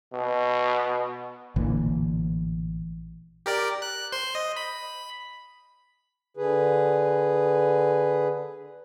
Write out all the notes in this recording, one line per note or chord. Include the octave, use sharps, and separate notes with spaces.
B2
A1 A#2 D3 E3
G4 A#4 D5
F#6
C5 C6
D#5
B5
D3 G#4 B4